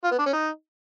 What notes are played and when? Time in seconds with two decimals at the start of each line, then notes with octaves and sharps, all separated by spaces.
0.04 F4
0.11 B3
0.19 D4
0.26 C#4
0.33 D#4